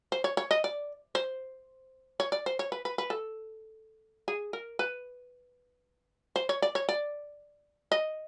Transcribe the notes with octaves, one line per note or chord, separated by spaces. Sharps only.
C5
C#5
C#5
D#5
D5
C5
C#5
D5
C5
C#5
B4
B4
B4
A4
G#4
A#4
B4
C5
C#5
D5
C#5
D5
D#5